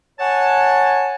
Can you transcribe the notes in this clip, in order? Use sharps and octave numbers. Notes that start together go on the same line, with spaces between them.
C#5 F#5 G#5 A5